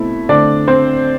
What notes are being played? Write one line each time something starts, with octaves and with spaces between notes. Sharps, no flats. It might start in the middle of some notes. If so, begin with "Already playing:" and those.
Already playing: B2 A3 C4 E4
D3 A3 C4 D4 D5
C4 C5